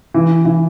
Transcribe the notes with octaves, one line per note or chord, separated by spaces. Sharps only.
E3
E3